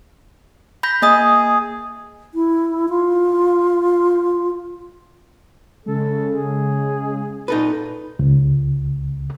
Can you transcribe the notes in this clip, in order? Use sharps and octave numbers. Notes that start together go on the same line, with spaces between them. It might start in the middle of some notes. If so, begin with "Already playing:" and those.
B5 G6 A#6
A#3 G#4 D#5 D#6
E4
F4
C#3 G#3 A4
G#4
A#2 D#4 A4 B4
C#2